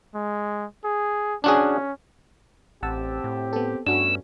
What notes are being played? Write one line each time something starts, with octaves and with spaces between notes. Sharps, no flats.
G#3
G#4
C#4 D4 F#4 G#4
A1 C4 G4 F#5 A5 E6
A2
B3 A4
G2 A3 B3 C#4 D4 F#4 E6